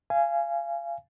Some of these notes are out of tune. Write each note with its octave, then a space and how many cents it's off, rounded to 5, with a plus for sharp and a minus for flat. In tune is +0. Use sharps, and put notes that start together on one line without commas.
F5 -30 G#5 +0